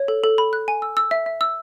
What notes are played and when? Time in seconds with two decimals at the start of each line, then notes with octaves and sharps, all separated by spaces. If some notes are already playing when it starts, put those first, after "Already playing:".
Already playing: C#5
0.08 A4
0.24 A4
0.38 B5
0.53 F#6
0.68 G#5
0.82 E6
0.97 E6
1.11 E5
1.26 E5
1.41 E6